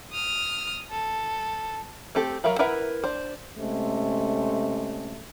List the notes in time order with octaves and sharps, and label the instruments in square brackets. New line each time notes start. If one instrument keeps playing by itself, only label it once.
[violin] D#6 F6
A4
[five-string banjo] A3 C4 G4 A4
F#3 A#4 E5 F5 B5
E4 A#4 B4 E5 F#5
D4 C5
[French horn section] C3 G#3 A3 C#4